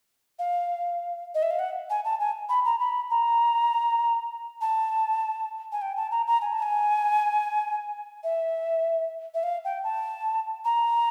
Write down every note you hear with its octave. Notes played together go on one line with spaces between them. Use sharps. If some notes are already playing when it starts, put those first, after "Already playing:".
F5
D#5
E5
F5
F#5
G#5
A5
G#5
B5
A#5
B5
A#5
A5
G#5
G5
A5
A#5
A#5
G#5
A5
G#5
E5
E5
F5
G5
A5
A#5